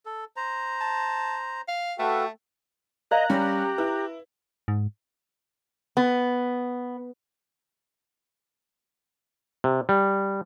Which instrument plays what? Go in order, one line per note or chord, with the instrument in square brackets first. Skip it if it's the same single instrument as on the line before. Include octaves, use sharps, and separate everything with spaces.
[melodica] A4
C5 A#5
[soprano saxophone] A5
F5
[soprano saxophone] A3 [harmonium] F#4 A4 G5 [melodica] B4 E5 F5
[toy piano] A#4 D5 F5 [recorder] D#5 [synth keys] A#5 F#6
[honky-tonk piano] G3 C#4 [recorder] G4
[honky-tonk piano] E4 [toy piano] B4
[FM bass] G#2
[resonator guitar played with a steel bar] B3
[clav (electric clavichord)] C3
G3